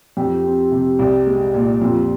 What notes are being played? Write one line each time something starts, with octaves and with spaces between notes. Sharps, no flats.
F2 G4
C4
C3
C2
G#3
A#2
F2 F4